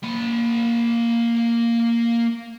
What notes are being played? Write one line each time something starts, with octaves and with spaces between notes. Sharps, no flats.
A#3 B5